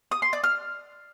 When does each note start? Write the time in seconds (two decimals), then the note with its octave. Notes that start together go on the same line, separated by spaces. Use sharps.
0.11 D#6
0.22 C6
0.33 D5
0.44 F6